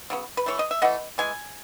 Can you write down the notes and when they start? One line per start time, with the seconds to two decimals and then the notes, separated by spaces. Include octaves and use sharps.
0.10 C#3 F#3 B3
0.37 B4
0.46 E3 A3 C#5
0.59 D#5
0.71 E5
0.82 E3 A3 D#5 F#5
1.18 E3 G#3 G#5